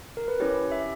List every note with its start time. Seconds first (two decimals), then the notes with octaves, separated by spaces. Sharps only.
0.17 A#4
0.28 B4
0.40 C#4 E4 G4 C#5
0.72 E5